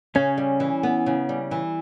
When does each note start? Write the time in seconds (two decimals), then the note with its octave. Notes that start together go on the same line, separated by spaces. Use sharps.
0.15 C#3 C#4
0.38 G3
0.60 E3
0.83 B3
1.06 C#3
1.29 G3
1.51 E3